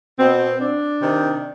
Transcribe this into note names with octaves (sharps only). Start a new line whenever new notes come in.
B2 C4
D4
C3 D#3